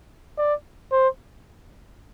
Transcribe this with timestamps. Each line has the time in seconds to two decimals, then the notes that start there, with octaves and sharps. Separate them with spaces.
0.38 D5
0.92 C5